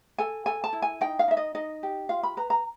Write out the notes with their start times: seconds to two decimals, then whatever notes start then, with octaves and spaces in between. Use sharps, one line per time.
0.18 A4 G#5
0.46 A4 G#5
0.64 A5
0.73 E4
0.82 G#5
1.01 D#4 G5
1.19 F5
1.28 D#4 E5
1.37 D#5
1.55 D#4 D#5
1.83 G4
2.09 F4 F5
2.23 B5
2.37 B4 A#5
2.50 A#5